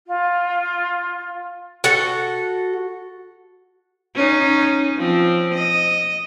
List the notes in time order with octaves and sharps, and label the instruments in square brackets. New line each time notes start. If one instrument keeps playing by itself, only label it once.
[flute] F4
[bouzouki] F#4 A4 F#5
[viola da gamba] C#4 D#4
F3 C4
D#5